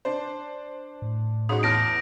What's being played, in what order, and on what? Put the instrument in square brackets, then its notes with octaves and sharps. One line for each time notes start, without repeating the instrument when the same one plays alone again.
[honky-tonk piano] D4 C5
[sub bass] A2
[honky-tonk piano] G#2 C#4 F#4 [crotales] D#6
[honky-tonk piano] E2 A5 F6 [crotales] A#6 D7